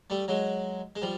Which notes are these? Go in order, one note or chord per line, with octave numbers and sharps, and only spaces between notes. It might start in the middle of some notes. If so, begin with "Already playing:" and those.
G3 A3
F#3 G#3
G#3
F3 G3